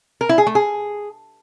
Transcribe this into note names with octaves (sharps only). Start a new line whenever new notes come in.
A#4
E4
G#4
A3
G#4